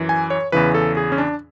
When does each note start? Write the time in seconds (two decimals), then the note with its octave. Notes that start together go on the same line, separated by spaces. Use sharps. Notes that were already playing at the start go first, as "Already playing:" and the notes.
Already playing: F#2 E3
0.09 G#5
0.30 C#5
0.52 E2 C#3 E3 B4
0.74 A4
0.97 G#4
1.12 C#4
1.18 D4